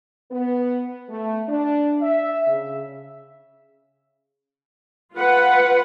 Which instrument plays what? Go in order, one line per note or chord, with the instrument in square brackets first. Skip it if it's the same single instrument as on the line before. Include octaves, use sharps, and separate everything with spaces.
[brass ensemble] B3
A3
D4
E5
C#3
[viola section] F4 B4 F#5